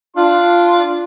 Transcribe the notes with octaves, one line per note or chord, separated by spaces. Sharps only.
D4 F4 C6